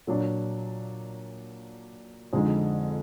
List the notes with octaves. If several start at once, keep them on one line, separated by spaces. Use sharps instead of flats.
A#2 F#3 D4
F2 D3 G#3 D#4